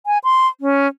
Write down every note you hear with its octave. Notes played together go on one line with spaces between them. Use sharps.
G#5
C6
C#4